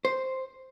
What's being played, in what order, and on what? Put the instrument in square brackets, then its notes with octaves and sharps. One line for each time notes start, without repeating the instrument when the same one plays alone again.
[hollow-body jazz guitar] C5